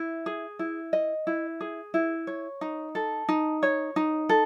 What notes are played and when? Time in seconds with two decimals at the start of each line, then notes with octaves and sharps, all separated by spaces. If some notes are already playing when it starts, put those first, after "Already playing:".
Already playing: E4
0.26 G#4
0.59 E4
0.93 D#5
1.27 E4
1.61 G#4
1.94 E4
2.27 C#5
2.61 D#4
2.95 A4
3.29 D#4
3.63 C#5
3.96 D#4
4.29 A4